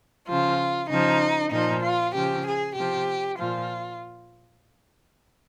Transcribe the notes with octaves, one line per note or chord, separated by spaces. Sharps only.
C#3 F3 F4
C#3 F3 D#4
A#2 F3 D#4
F4
C#3 F3 G4
G#4
C3 F3 G4
A#2 F3 F4